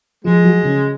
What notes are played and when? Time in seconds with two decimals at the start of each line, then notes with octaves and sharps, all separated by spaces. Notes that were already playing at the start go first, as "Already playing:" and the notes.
0.24 F3 G#3 F4
0.45 F#3 F#4
0.63 C#3 C#4